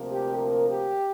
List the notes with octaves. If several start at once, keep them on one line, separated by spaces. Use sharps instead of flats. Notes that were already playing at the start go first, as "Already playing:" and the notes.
Already playing: D2 C3 F3 A#3
G4
A#4
G4